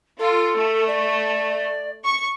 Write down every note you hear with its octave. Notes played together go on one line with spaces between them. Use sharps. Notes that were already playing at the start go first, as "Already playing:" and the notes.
F4 A4
A3
D5
C#6